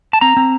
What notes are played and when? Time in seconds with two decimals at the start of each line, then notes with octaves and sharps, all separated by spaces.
0.13 A5
0.21 C4 A#5
0.37 C4